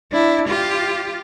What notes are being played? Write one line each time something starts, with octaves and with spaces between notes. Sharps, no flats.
D4 E4
F4 G4